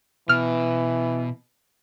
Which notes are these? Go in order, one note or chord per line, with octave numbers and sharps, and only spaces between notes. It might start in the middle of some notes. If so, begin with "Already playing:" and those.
B2 E3 F6